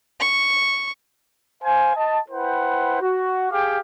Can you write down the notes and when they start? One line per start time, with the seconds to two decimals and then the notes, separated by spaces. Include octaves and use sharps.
0.20 C#6
1.63 C5 F5 G#5
1.96 D#5 A5
2.30 E4 B4 C5 F#5 G5
3.01 F#4
3.51 G4 G#4 F5 G5 D6